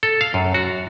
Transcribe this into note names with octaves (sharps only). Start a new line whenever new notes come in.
A4
F5
F#2
F#4